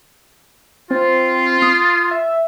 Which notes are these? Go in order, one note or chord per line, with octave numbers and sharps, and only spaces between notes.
C4 F4
D#6
E5